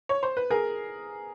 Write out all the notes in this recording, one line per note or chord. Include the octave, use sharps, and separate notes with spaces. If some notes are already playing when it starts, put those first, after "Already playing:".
C#5
C5
B4
G#4 A#4